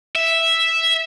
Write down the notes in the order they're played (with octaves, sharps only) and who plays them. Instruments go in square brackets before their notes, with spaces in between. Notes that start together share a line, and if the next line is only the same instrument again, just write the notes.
[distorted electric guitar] E5